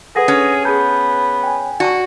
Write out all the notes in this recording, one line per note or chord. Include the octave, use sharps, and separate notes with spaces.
G#4 A4 B4 F#5 D#6 A#6
C#4
B3 G#4 A5 G6
G5 G#5
F#4 D5 A5 C#6